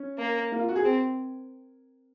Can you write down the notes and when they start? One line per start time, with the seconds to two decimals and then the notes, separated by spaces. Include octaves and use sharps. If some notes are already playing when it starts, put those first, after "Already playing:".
Already playing: C#4
0.19 A#3
0.52 A#3
0.59 F4
0.69 F#4
0.76 G#4
0.84 C4